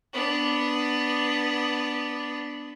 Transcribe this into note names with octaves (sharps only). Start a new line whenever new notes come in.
B3 D4